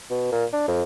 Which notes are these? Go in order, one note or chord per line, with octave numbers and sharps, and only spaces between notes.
B2
A#2
D4
F2